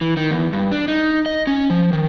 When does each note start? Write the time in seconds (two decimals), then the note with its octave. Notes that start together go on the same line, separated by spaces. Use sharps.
0.01 E3
0.17 D#3
0.31 E2
0.53 G2
0.72 D4
0.88 D#4
1.26 D#5
1.47 C#4
1.70 F3
1.93 D#3